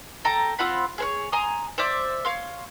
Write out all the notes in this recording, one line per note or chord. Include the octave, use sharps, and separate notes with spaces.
A4 G5 A5 A#5
C4 F4 F#5 B5
G#4 C5 C#5
G#5 A#5 C6 D#6
C5 D5 E5 D6
C#5 F5 C6